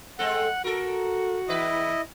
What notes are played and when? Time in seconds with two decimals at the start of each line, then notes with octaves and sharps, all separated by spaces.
0.19 G#3 C4 A4 F#5
0.64 F#4 A4 A#4
1.48 E2 E4 B4 D#5